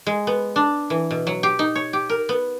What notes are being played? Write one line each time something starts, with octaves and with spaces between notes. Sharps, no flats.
G#3
B3
D4
E3
B2
F#3
G4
D#4
C#5
G4
A#4
B3